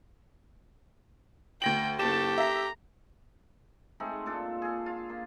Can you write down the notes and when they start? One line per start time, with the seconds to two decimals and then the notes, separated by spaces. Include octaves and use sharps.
1.62 D2 G5 A#6 F#7
1.99 F#1 G4 A4 A5 E7
2.38 E5 A#5
4.00 G#3 A3 C4 D#4
4.26 A#2 D4 A4
4.62 G#4 A4
4.86 F4
5.10 A#3